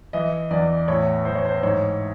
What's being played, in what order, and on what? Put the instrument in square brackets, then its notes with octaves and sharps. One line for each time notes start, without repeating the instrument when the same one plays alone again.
[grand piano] E3 D#5
E2 D5
A2 C#5
E3 C5
C#5
C5
G#2 C#5